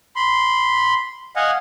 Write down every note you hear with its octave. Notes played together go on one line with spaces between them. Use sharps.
B5 C6
D#5 F5 F#5 G#5